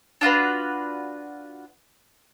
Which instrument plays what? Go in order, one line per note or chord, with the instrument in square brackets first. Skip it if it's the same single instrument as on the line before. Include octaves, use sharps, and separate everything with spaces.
[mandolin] D4 F4 F#4 B4